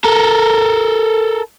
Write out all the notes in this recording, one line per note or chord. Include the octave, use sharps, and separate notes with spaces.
A4 A#4